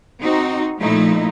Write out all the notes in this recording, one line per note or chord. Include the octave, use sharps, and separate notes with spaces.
C4 D#4 F#4
A#2 F3 A3 D#4 E4